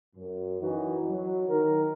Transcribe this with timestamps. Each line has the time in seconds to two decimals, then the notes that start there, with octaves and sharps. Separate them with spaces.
0.16 F#2
0.60 F#2 E3 D#4 F#4
1.08 F#3
1.48 D#3 A#4